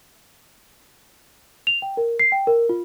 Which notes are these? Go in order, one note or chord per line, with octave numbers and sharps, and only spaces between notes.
F7
G5
A#4
C7
G5
A#4
F4